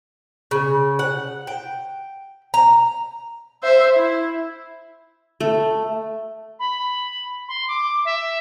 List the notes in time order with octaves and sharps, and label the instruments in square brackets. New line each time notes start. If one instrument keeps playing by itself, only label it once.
[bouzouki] C#3
F#5
G5
A#5
[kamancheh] C5 E5
E4
[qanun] A3
[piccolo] B5
C6
D6
E5